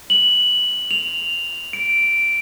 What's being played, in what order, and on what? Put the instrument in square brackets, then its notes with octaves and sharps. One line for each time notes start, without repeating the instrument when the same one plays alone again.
[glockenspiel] F#7
F7
D7